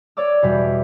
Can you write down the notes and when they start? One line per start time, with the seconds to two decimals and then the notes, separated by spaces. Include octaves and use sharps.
0.17 C#5 D5 D6 E6
0.42 E2 B2 G3